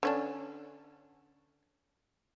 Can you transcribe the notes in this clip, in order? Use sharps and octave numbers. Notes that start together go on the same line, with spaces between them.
D3 C#4 D4